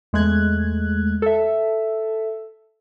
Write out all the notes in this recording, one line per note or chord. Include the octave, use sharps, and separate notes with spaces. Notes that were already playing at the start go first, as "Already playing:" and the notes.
E2 G#3 A3 F#6 G#6
A4 E5